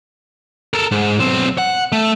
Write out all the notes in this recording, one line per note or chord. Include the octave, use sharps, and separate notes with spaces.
A4 A#4
G#2
B1 C4
F#5
A3